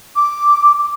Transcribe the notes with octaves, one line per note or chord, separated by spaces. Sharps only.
D6